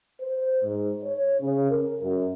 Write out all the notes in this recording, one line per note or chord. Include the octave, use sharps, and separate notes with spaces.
C5
G#2
C#5
C#3
A#4
F#2